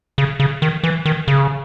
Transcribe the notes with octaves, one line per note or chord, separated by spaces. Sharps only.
C#3
C#3
D#3
E3
D#3
C#3